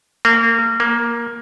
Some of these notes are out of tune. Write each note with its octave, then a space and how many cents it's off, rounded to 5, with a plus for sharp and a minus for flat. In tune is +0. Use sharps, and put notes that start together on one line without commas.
A#3 -30
A#3 +10